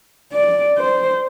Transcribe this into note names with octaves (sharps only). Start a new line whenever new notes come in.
D5
C5